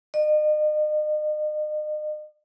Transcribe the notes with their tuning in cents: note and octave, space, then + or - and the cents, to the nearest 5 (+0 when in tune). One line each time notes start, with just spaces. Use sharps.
D#5 -40